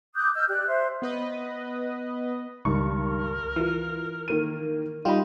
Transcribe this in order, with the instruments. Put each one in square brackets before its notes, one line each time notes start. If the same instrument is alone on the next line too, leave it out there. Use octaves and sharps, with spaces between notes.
[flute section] D6 D#6 F#6 G6
D#5 E6 F6 G6
G4 D5 F#6
C5 E5
[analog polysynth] B3 B4 D#5
[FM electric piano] C#2 [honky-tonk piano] G2 D#3 C#6 [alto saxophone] A#4
[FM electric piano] E3 [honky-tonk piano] F4 F6
[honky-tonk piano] D#3 A#3 D#7
[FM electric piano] G3 F4 [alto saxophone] D#4 [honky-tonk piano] G4 B5